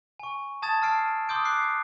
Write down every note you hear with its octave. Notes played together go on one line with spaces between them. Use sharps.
G#5 C#6
A5 D#6 G#6 A6 E7
A5 E6 F6 C7 D7
C6 D6 D#6 F6 G6 D7
D6 F#6 C7 D7